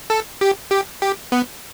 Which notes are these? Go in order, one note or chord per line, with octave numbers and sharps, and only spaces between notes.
A4
G4
G4
G4
B3